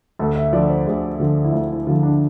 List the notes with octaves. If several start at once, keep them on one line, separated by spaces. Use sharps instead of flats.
D2 A4
E5
D3 F3 D5
C5
D2 G#4
D3 F3
E4
D2 F4
E4
D3 F3 F4
D4